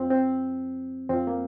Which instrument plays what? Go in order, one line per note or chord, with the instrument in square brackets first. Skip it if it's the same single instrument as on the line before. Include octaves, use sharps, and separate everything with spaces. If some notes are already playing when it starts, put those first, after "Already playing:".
Already playing: [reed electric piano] F2 F3 C4
C4
F2 F3 C4
A#3